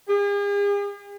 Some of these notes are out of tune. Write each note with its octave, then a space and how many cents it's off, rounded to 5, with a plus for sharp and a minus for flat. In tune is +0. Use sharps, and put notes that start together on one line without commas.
G#4 -45